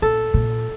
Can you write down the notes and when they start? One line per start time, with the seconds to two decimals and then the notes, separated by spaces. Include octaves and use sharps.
0.02 A#2 A4
0.34 A#2